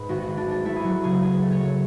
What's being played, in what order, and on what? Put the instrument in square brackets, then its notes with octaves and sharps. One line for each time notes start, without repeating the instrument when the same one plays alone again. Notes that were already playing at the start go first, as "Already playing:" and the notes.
Already playing: [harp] G#2 B4
G#1 F#4
G#1 F#4
D4
G#3
D4
A3 E4
G#4
F#3 F#4
C#3 G#4
D2 G#4
A3
C#5
F#3